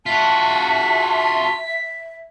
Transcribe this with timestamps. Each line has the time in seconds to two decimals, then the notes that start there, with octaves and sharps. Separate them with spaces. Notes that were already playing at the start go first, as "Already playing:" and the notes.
0.06 F4 F#4 E5 A5 B6